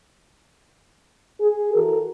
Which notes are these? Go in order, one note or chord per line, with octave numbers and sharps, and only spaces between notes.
G#4
E3 F#4 A4 A#4